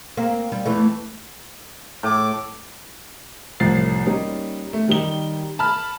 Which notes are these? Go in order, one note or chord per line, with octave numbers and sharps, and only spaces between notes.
A#3 C4
G3
E2 E3 A3
A2 D6
C2 A2 F3 A6 C7
G3 A#3 C#4 D#4
A3
D#3 G3 D#4 G7
A5 B5 F6